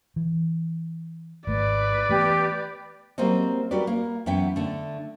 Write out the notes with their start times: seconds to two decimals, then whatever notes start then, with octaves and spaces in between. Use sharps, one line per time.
0.16 E3
1.47 G#1 A3 B4 D5
2.09 E3 A3 B3 G4
3.18 F#3 G3 A#3 C4 C5 D#5
3.71 G3 F#4 A#4 B4 D5
3.87 A#3
4.26 F#2 E3 B3 E5 F#5 G5
4.56 D3 A3